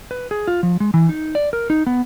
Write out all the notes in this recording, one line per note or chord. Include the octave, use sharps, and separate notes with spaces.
B4
G#4
F4
F3
G#3
E3
D#4
D5
A#4
D#4
B3